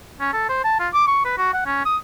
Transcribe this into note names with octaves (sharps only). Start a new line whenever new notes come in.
C#4
A4
C5
A5
F4
D6
C#6
B4
F#4
F#5
C#4
D#6